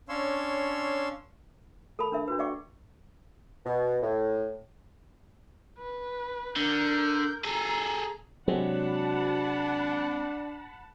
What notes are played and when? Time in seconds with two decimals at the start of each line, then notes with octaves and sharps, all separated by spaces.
0.09 C#4 D4 C#5 F5 C6 E6
1.99 A4 A#4 A5 B5
2.12 D4 A#4 E5
2.28 D4 F#4 B4
2.39 D5 E5 F#5 G5 C#6 D6
3.66 B2
4.03 A2
5.79 B4
6.57 D3 A#4 G6
7.44 G#4 A4 A#5
8.48 C3 F#3 G#3 C4 D4 F#5 A5 B5